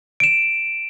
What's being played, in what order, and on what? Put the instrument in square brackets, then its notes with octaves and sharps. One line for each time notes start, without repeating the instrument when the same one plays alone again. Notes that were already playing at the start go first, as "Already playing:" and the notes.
[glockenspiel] D7 E7